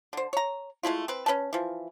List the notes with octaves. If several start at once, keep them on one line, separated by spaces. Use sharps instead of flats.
D3 C5
C#5 A#5
G#3 A3 E4 F4
C4 B4
C#4 B4 G#5 A5
E3 F3